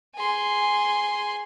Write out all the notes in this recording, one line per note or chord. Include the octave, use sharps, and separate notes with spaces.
G#4 C6